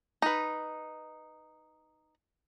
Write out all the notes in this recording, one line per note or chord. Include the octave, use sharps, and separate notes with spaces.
D#4 B4